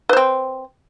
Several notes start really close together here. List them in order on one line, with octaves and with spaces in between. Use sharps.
B4 C5 C4